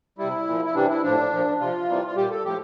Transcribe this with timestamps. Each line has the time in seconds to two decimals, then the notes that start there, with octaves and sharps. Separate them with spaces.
0.18 C3 G3 E4
0.47 A#2 F3
0.66 E4
0.75 C3 E3 G3 D4
0.89 E4
1.03 A2 F3 D4
1.31 A#2 F3
1.60 C3 F3 F4
1.88 C3 E3 G3
2.07 F4
2.16 A#2 G3 G4
2.31 A4
2.44 A2 F3 G4